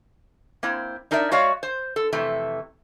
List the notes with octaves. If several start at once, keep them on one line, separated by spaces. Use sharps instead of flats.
A#3 C4 E4
D4 D#4 A#4 D5 E5
G#3 F#4 C#5 D5 F5
C5
A4
F2 C3 E3 A3